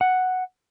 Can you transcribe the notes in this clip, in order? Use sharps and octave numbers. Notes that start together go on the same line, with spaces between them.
F#5